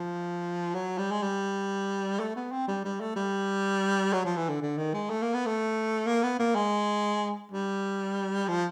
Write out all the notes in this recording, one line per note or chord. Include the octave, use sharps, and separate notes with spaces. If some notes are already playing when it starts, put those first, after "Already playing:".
Already playing: F3
F#3
G3
G#3
G3
A3
B3
C4
G3
G3
A3
G3
F#3
F3
E3
D3
D3
D#3
G#3
A3
A#3
B3
A3
A#3
B3
A#3
G#3
G3
F3